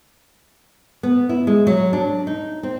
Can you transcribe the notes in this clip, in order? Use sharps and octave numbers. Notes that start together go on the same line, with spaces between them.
B3
E4
G#3
F#3
D4
D#4
C4